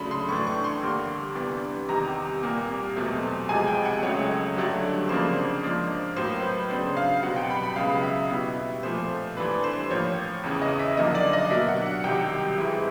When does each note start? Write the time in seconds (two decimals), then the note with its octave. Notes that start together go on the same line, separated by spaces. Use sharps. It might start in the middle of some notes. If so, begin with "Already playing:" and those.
Already playing: C#3 F#3 A3 D4 B5 C6
0.11 C6
0.29 A2 E3 A3 D4 C#6
0.47 C#6
0.64 C6
0.82 G2 D3 G3 A#3
1.36 C3 E3 G3 B3 D4
1.89 E2 C3 D#3 G3 A#5
2.43 C2 A#2 G3 A#3
2.96 E2 B2 F#3 A3 C4
3.49 F2 C3 F3 G#3 G#5
3.67 G5
3.85 F#5
4.03 C#2 C#3 F#3 A3 C#5
4.56 G2 D3 F#3 A3 D4
5.09 F2 C#3 F3 A#3 D4 C5
5.63 G#2 F3 A#3 D4
6.16 A2 F#3 A#3 C5
6.43 B4
6.70 C#3 F#3 B3 D4 C5
6.97 F5
7.23 C2 B2 F#3 B3 F#5
7.36 G5
7.50 B5
7.64 B5
7.76 C#2 C#3 F#3 B3 F5
8.03 E5
8.30 B2 G3 B3 E4
8.83 A#2 F3 A3 C5
9.37 G2 E3 A3 D4 B4
9.64 C5
9.91 A2 F3 A#3 C#5
10.43 E2 C#3 E3
10.61 D#5
10.79 E5
10.97 F#2 D3 F3 A#3 D#4 D#5
11.15 D5
11.33 D#5
11.50 B2 F#3 A#3 D4 E5
11.68 F#5
11.86 F#5
12.04 C2 C3 D#3 F#3 G5
12.58 G#2 E3 G#3 C4 E4